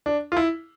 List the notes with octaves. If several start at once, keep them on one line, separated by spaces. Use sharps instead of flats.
D4
F4
E4